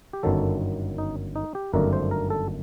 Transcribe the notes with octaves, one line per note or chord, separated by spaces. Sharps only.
G4
G1 F#2 D#3 F#3 A4
D#4
D#4
G4
G1 F#2 D#3 A3 D4 A#4
C5
A#4
A4